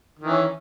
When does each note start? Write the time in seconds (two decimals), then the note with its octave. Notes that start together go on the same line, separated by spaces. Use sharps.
0.19 D#3
0.24 E3
0.29 C#4